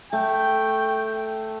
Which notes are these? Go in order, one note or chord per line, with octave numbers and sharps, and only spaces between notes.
A3 G5